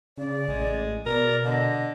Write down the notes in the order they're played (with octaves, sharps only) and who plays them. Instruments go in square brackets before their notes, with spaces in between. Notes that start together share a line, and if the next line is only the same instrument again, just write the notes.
[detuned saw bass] C#3 [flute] D5
[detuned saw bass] A1 [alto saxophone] G#3
[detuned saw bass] B2 [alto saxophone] A#4 [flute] D5
[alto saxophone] D3 [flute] D#5